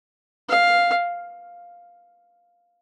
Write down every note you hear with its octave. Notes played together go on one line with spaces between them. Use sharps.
F5